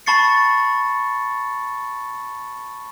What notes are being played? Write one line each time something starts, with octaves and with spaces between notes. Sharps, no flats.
A5 B5 C#6 A6 C7 C#7